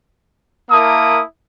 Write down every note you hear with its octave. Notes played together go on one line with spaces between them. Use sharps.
A#3 E4 A#4 A5 D#6